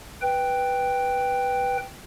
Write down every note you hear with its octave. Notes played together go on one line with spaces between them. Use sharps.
B4 G5